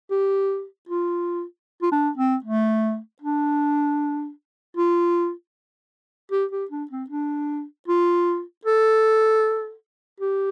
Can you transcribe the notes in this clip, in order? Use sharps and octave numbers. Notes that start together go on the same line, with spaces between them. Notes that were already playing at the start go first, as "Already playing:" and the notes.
G4
F4
F4
D4
C4
A3
D4
F4
G4
G4
D4
C4
D4
F4
A4
G4